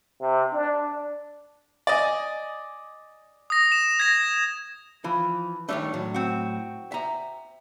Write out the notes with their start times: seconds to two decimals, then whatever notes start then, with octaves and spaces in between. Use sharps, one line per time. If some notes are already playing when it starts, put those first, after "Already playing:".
0.21 C3
0.53 D4
1.87 D5 D#5 G#5
3.50 D#6 A#6
3.72 E7
4.00 G#6 A#6
5.04 E3 F3
5.69 D#3 G3 A3 D4 C#5
5.94 A2 F#3
6.14 C4 F#4
6.92 E5 A#5